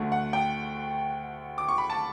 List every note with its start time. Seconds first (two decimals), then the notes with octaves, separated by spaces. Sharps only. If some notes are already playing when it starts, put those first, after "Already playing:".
Already playing: D2 D3 A3
0.12 F#5
0.33 G5
1.58 D6
1.68 C#6
1.78 B5
1.90 A5